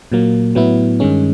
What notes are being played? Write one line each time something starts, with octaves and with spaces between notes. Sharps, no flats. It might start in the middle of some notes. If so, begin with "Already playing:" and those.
A#2 F#3 A#3
A2 F#3 B3 E4
G2 D#3 G#3 C#4